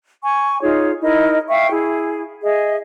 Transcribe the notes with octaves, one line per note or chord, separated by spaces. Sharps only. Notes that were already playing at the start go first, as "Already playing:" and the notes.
G#5 C#6
D#4 F4 G#4 C#5
D#4 E4 A#4 D#5
E5 F5 G5 C#6
E4 G#4
G#4 D#5 E5